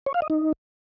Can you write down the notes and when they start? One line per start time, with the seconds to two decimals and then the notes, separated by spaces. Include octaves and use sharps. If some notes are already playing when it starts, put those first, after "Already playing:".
0.06 C#5
0.14 F5
0.22 D#5
0.30 D#4